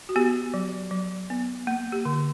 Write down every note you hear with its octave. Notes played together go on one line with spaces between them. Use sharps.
F#4
B3 G4
F#3
F#3
B3
A#3
G4
D3